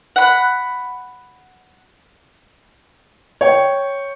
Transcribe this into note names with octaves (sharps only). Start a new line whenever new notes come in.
F#5 B5
C#5 G5